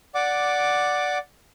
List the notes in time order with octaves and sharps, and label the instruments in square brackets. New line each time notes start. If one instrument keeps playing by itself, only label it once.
[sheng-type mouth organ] D5 F#5 D6